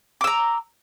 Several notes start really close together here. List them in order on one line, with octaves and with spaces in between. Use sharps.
D6 E6 A#5